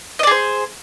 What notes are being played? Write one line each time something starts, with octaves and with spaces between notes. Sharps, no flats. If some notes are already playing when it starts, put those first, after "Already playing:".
G#4 C5 D5 D#5